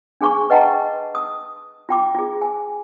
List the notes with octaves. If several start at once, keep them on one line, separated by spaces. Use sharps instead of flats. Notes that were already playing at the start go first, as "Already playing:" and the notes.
D4 G#4 G#5 C#6 D6
B4 D#5 F#5 G5 A5 A#5
D#6
F4 G5 D6
F4 G#4
G#5